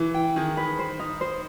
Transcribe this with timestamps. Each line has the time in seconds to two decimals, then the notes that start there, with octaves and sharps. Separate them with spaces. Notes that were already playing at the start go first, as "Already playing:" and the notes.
Already playing: E3
0.14 G5
0.36 D#3 G#4
0.57 B4
0.79 C5
0.99 D#4
1.21 C5